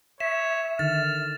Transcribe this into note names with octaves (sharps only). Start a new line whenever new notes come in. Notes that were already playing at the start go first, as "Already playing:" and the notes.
C#5 E5 E7
D3 D#3 F6 A6